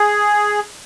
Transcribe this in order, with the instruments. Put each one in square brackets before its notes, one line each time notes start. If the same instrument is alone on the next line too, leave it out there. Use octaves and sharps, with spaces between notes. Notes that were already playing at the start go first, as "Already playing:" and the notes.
Already playing: [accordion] G#4